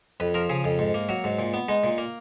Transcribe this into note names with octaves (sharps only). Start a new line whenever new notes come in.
F2 B4
F3 A#4
C#3 G#4
F2
G#2
A#3
F#3 F#4
G#2
A#2
B3
G#3 D#4
A#2
A#3